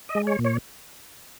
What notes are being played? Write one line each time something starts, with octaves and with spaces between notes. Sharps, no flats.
D#5
G#3
C#5
A#2
C#5